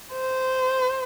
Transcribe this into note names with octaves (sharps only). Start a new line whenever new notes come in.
C5